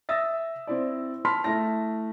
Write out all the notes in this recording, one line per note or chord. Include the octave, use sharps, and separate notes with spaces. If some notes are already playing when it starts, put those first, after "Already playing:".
E5 D#6 E6 A6 A#6
C4 E4 D5
A5 B5 C6 F6 B6
A3 E4 A5 A#6